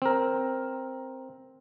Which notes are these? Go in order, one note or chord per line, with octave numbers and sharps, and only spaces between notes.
C4 A#4